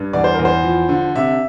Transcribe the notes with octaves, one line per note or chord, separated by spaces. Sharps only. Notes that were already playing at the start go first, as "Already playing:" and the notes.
Already playing: G2
E2 D5
C5
E2 A#4
C5
F3
D3
C3 E5